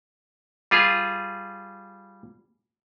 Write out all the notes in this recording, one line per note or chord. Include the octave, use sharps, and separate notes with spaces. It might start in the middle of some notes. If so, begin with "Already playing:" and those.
G3 F4 G#4